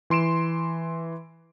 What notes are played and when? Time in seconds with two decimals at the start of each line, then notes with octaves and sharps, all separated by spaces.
0.10 E3 C6 D7 E7